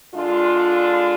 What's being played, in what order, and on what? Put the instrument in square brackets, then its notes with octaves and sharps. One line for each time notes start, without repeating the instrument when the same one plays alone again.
[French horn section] D3 G#3 D4 F4